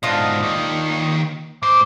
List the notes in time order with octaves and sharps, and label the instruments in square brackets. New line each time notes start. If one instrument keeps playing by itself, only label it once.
[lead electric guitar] G#2 B2 [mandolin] D4 F4 D#5
[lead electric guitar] D#2 D#3
[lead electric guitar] G#2 C5 [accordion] D6